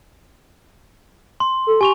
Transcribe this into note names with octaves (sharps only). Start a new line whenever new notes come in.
C6
A4
G4 G#5 C#6 F7